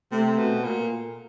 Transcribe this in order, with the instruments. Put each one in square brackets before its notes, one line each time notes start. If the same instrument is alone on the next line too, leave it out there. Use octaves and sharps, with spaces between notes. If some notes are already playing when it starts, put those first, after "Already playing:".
[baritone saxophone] C3 [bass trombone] A3
[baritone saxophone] B2
A#2